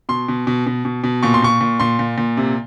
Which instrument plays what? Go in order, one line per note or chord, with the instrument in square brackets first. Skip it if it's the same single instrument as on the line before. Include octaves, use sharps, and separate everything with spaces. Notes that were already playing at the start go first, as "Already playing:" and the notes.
[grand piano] B2 C6
B2
B2
B2
B2
B2
A#2 C#6
C6
A#2 C#6
A#2
A#2 C6
A#2
A#2
C3